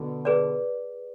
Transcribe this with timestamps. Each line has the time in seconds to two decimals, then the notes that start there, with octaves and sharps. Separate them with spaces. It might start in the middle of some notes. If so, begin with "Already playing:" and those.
Already playing: B2 D3
0.25 G#4 B4 D5